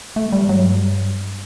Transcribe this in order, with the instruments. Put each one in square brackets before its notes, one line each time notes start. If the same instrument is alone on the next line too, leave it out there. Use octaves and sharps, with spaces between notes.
[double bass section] G2 [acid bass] A3
[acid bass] G3
F#3